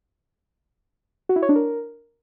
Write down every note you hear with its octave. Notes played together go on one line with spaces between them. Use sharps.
F#4
E4
C#5
D4
A#4